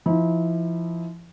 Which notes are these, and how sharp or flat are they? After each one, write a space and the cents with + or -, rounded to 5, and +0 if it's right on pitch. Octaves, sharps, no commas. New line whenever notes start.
F3 -35 E4 -35